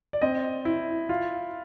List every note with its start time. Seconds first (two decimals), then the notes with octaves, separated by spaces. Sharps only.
0.13 D5
0.22 C4 D#5
0.65 E4
1.09 F4